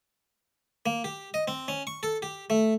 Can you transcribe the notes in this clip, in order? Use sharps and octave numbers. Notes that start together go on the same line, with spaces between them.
A#3
G4
D#5
C4
C#4
C#6
A4
G4
A3